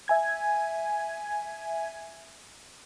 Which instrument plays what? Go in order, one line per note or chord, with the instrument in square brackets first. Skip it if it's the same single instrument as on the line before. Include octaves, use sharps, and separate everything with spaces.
[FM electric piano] E5 G#5 G#6